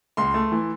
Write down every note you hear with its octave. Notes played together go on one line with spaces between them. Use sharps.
C#2 C6
A3
E3